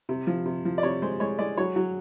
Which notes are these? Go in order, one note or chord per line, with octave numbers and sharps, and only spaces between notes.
C3
F3
C3
F3
D5
C3 C#5
G#3 C5
G#3 C#5
G#3 D5
F#3 C#5
F#3